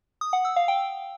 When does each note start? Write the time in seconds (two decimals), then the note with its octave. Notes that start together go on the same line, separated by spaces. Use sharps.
0.21 D#6
0.33 F#5
0.45 E6
0.56 F5
0.68 G5